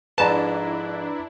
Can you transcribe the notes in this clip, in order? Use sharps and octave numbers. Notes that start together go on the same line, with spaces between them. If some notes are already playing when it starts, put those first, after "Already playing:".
F2 G#2 D4 E4 B4 D5 A5 A#5